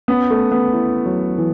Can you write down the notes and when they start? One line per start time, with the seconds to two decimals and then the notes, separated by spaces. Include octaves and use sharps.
0.08 B3 C#4
0.30 A3
0.41 C#4
0.52 B3
0.74 E4
1.06 F#3
1.39 E3